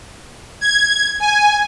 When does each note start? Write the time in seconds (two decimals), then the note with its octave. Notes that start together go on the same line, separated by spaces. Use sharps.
0.61 G#6
1.20 G#5